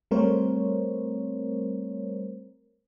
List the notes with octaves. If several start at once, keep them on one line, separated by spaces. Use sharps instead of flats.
G3 A3 C4 A#4 C5 C#5